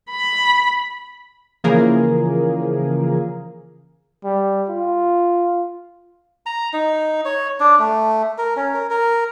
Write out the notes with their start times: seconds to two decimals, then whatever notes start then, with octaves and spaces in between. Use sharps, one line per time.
0.10 B5
1.64 C#3 E3 F3 A#3 G#4 A#4
4.24 G3
4.70 F4
6.46 A#5
6.73 D#4
7.25 C#5
7.60 D4
7.79 A3
8.38 A#4
8.56 C#4
8.74 A#4
8.90 A#4